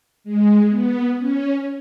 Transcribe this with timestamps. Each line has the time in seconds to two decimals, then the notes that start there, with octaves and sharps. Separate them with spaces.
0.24 G#3
0.70 B3
1.17 C#4